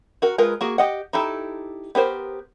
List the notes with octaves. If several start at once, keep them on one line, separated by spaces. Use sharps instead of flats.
F#4 A#4
G#3 F4 A#4 B4
A#3 F#4 G#4
G4 D#5 F#5
D#4 E4 G4 A4
B3 G4 A#4 C5